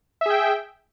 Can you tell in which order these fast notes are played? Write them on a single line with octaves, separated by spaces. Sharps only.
E5 G#4 G5